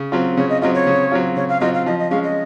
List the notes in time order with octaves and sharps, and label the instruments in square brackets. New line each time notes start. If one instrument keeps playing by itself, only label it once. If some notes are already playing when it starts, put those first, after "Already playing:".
Already playing: [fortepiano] C#3
F#3 C4 F4
[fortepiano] C#3 [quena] C#5
[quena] D#5
[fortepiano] F#3 C4 F4 [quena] D#5
[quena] C#5
[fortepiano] C#3
F#3 C4 F4
[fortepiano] C#3 [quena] C#5
[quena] F5
[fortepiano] F#3 C4 F4 [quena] D#5
[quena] F5
[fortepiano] F3 [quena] D#5
[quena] D#5
[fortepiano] G#3 C#4 [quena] F5
[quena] D#5